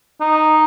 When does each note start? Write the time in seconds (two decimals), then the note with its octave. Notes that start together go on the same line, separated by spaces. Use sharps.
0.20 D#4